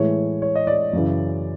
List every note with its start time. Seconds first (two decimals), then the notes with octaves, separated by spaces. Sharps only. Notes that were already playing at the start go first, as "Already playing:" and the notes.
Already playing: A2 E3 G#3 C#5
0.42 C#5
0.55 D#5
0.67 D5
0.93 F#2 C#3 E3